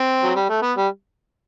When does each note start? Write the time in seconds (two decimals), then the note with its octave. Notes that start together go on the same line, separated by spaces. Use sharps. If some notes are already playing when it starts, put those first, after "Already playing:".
Already playing: C4
0.23 F#3
0.36 G3
0.49 A3
0.62 B3
0.77 G3